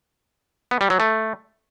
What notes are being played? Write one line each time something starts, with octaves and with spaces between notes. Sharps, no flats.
B3
G3
F#3
A3